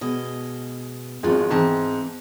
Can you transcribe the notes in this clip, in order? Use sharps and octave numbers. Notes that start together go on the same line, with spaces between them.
B2 G#3 D#5
G#1 F3 G#3 F4 F#4
G#2 E3 C4 A5